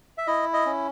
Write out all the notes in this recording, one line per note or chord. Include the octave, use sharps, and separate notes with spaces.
E5
E4 D#5
D#5
C#4